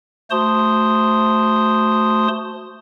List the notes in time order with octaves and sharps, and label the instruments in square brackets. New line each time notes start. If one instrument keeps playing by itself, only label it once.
[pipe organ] A3 F#4 C5 A5 C6 D#6